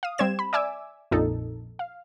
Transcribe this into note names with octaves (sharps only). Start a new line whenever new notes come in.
F5 D#6
G3 C4 G4 C5 G#6 E7
B5
D5 E5 G#5 D6 E6
A#1 F2 A#2 D#4 A4
F5